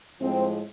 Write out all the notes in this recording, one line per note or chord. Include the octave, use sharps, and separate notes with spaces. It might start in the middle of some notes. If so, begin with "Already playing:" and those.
A2 F3 G#3 C4